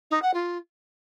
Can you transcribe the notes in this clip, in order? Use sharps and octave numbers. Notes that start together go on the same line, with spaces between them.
D#4
F#5
F4